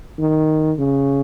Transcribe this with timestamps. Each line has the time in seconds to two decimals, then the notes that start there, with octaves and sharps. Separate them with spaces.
0.19 D#3
0.79 C#3